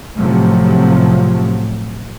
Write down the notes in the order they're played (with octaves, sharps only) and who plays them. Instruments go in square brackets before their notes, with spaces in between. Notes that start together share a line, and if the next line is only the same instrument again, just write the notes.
[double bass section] A2 C3 F3 F#3